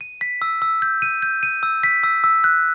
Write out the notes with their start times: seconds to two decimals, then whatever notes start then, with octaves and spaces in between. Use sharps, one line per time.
0.01 D#7
0.21 B6
0.42 E6
0.62 E6
0.82 G6
1.02 D#7
1.22 G6
1.43 D#7
1.63 E6
1.83 B6
2.03 E6
2.24 E6
2.44 F#6